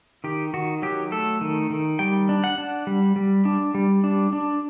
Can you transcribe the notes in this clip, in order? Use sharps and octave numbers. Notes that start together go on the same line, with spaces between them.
D#3 G4
D#3 F#4
F#3 G4
A3 A4
D#3
D#3
G3 G5
D4
F#5
D4
G3
G3
D4
G3
D4
D4